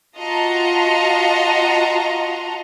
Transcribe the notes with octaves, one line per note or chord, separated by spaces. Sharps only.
F4 F#4 D#5 A5 A#5 C6